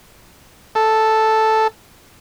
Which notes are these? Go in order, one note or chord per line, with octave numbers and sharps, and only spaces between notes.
A4